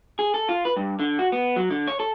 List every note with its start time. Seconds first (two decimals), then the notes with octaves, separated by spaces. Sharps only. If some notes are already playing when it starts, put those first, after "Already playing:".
0.19 G#4
0.34 A4
0.49 F4
0.65 B4
0.76 G2
1.00 D3
1.19 F#4
1.32 B3
1.56 F#3
1.71 D3
1.88 C#5
2.00 A4